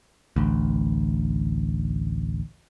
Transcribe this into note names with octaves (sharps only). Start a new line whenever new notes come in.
A1 D2